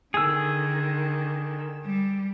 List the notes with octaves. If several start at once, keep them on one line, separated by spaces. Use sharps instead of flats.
D3 D#3 G#4 E6
G3